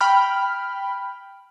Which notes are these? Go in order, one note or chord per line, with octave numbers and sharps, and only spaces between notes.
G5 B5 F6